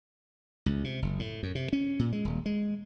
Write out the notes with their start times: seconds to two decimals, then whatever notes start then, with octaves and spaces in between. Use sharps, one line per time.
0.66 C#2
0.84 C3
1.02 F#1
1.19 A2
1.43 F#2
1.55 C3
1.73 C#4
1.99 A#2
2.12 G#3
2.25 D#1
2.46 G#3